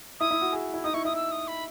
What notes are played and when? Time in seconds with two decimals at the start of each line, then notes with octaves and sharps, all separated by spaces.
0.20 E4 D#6
0.31 E4
0.42 F#4
0.53 G#4
0.74 E4
0.84 D#4 D#6
0.94 E4 C#6
1.05 E4 D#6
1.16 E6
1.31 D#6
1.48 B5